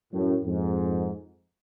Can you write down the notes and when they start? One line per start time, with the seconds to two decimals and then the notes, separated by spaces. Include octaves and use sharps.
0.13 F#2 A2
0.44 F2 G#2